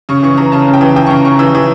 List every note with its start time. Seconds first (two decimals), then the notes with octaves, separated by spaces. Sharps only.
0.09 C#3 C#6
0.23 E3 C#6
0.37 E3 A#5
0.52 C#3 A5
0.67 C#3
0.74 G5
0.81 E3
0.96 E3 G5
1.06 C#6
1.10 C#3 A#5
1.25 C#3 C#6
1.39 E3 E6
1.55 E3